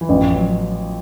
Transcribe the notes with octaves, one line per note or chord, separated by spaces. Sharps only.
E3
A1 F3
F#3